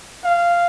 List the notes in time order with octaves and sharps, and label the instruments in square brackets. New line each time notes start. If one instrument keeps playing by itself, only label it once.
[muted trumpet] F5